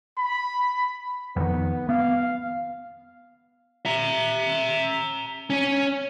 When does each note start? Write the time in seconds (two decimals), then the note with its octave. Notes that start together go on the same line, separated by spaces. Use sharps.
0.18 B5
1.36 F2 D#3 B3
1.89 B3 F5
3.85 E5 A#5
5.50 C#4 C#5